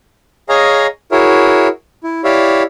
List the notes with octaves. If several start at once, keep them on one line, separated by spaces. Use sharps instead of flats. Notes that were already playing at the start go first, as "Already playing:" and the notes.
G#4 C#5 D#5 F5 G#5 A#5
E4 F#4 G#4 A#4 C#5 E5
E4
E4 G4 C#5 D5 E5 F5